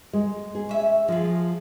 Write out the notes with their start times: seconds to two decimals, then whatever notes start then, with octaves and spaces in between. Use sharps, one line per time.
0.13 G#3
0.55 G#4
0.69 C#4 E5
1.08 F3 G#3 G#4